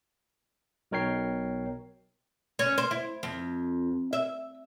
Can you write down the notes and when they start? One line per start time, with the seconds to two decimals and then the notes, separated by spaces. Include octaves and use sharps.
0.91 B1 B2 A#4 C#5 G5 C7
2.59 C#4
2.78 C5
2.91 E4
3.23 F2
4.13 E5